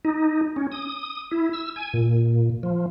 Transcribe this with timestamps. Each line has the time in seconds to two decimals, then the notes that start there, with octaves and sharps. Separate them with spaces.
0.05 D#4
0.56 C#4
0.72 D#6
1.31 E4
1.53 E6
1.76 G#5
1.94 A#2
2.63 F3